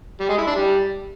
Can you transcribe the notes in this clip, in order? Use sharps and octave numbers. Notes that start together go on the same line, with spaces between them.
G3
G#3
E4
D4
G3